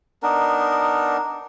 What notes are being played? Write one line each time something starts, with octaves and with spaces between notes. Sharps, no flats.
B3 D4 D#4 A#4